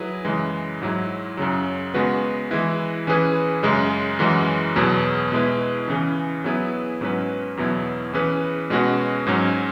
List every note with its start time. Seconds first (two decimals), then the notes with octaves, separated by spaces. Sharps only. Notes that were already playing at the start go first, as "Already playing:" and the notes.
Already playing: F#3 E4 G#4 B4
0.25 F#2 C#3 E3 G#3
0.82 G#2 F#3 E4
1.37 F#2 C#3 F#3
1.94 C#3 G#3 B3 F#4 B4
2.51 E3 G#3 E4 B4
3.07 E3 C#4 E4 G#4 B4
3.63 F#2 C#3 G#3
4.19 F#2 E3 G#3 C#4 F#4
4.76 E2 B2 F#3 B3 G#4
5.32 B2 G#3 E4 B4
5.88 C#3 E3 C#4 G#4
6.44 F#3 B3 E4 G#4 B4
7.01 G#2 F#3 C#4 F#4 B4
7.57 E2 B2 F#3 B3 E4
8.13 E3 C#4 G#4 B4
8.70 B2 G#3 C#4 F#4 B4
9.27 G#2 F#3 C#4